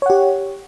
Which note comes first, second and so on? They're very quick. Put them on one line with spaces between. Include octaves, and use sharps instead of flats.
C#5 F#5 G4